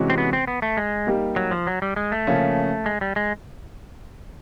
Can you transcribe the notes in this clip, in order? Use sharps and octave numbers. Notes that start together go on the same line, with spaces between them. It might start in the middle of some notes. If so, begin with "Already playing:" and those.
Already playing: C3 E3 G#3 C#4 F#4
C4
B3
C4
B3
A3
G#3
G3 A#3 D#4 G4
F#3
F3
F#3
G3
G#3
A3
C#3 F3 A#3 C#4
G#3
G3
G#3